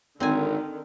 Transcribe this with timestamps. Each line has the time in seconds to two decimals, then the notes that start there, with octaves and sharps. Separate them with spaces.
0.20 G#1 D3 D#3 C4 G#5